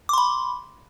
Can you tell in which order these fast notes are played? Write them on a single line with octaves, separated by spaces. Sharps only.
D6 C6 B5